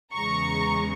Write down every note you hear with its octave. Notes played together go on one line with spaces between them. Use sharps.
E2 C#3 E3 G#3 A#5 C#6